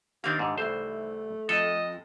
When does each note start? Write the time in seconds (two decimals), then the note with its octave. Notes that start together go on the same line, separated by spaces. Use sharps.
0.24 D#3 A#3 C4 D4 G4 F5
0.39 G#2 D3
0.58 C2 E3 A3 C5
1.49 F2 A4 D#5